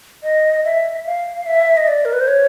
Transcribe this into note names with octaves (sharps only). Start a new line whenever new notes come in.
D#5
E5
F5
E5
D#5
D5
A#4
B4
C5
C#5